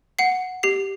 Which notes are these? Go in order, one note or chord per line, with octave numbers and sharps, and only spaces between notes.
F#5 C7
G4 C7